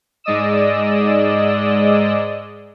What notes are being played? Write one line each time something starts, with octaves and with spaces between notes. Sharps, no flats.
G#2 G#3 D5 D#5 D#6 E6